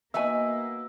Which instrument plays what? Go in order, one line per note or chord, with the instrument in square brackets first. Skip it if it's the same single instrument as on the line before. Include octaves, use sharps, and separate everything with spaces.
[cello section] A#3 [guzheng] B3 D#4 F#4 [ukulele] E5 G#5 [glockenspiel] E6